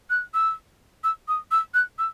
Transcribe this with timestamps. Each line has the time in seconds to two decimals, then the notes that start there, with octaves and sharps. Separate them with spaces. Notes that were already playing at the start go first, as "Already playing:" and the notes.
0.10 F#6
0.34 E6
1.04 E6
1.28 D#6
1.51 E6
1.74 F#6
1.99 E6